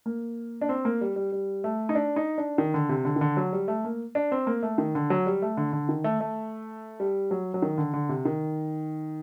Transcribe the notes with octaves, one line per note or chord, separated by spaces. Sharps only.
A#3
D4
C4
A#3
G3
G3
G3
A3
D#4
D4
D#4
D4
D#3
D3
C3
D3
D#3
D3
F#3
G3
A3
A#3
D4
C4
A#3
A3
D#3
D3
F#3
G3
A3
D3
D3
D#3
A3
A3
G3
F#3
F#3
D#3
D3
D3
C3
D#3